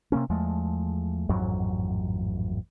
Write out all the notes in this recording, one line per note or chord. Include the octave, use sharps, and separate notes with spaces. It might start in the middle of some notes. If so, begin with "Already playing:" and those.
C3 A#3 C#4
E2 F3 G#3 A3
A1 F2 G#2 F#3